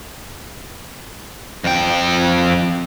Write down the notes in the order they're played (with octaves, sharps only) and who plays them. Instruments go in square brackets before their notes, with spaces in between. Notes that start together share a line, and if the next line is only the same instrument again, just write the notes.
[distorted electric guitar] F2 G5